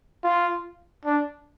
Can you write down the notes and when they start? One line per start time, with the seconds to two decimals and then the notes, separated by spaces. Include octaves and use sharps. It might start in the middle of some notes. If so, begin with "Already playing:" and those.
0.23 F4
1.05 D4